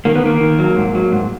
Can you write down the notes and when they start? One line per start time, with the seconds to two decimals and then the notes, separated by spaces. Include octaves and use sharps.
0.05 D#3 A#3
0.15 B3
0.23 D#3 A#3
0.41 D#3
0.59 F#3
0.76 G#2
0.95 F#3
1.12 G#2